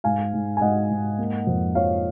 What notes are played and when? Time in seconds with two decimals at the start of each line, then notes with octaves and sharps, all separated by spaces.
0.04 G#2 F5 G#5
0.33 G#2
0.57 G#5
0.61 G#2 D#5 F#5
0.90 G#2
1.19 A#3
1.47 F2
1.75 F3 C#5 F5